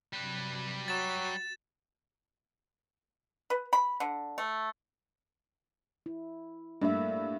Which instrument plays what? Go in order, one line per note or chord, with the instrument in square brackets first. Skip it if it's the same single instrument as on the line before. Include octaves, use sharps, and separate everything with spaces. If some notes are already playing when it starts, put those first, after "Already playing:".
[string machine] C3 F#3 [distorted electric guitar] G3 B4
[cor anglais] F#3 [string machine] F#4 [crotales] A6 E7
[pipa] B4
B5
D3
A3
[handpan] E4
[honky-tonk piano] G2 [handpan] A3 A#3 E5